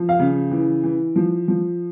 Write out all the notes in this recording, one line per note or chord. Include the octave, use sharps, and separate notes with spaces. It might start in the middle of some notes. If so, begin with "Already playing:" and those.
Already playing: F3
F5
C#3
E3
E3
F3
F3